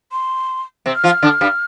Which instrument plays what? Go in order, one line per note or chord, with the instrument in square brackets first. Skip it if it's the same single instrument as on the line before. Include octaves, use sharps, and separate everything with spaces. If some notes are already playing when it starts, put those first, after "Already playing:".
[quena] C6
[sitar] C3 C4
[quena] F6
[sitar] F3 F4
D3 D4
G2 G3